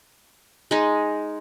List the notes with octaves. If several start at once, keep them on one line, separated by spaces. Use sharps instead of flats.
G#3 D#4